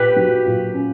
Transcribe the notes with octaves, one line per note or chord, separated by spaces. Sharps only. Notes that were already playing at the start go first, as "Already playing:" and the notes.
Already playing: A#2 G4 B4
F#3
A#2
C#4